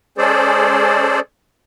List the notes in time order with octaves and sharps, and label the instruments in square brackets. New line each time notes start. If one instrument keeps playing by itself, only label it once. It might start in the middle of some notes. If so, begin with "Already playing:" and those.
[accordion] G#3 C#4 G#4 A4 C5 D5